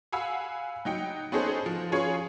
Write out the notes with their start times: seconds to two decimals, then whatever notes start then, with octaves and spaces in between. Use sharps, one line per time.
0.12 F5 F#5 G#5 B5 E6
0.85 F#3 D#4 G5 C#7
1.32 B3 C#4 D#4 G#4 A4 C5
1.66 F3
1.92 C#4 F4 G#4 B4 C#5 G#5